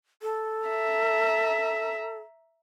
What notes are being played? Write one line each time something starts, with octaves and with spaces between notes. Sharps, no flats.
A4
E5 A#5